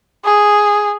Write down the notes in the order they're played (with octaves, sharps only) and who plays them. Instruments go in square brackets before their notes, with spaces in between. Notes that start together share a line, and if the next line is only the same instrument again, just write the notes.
[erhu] G#4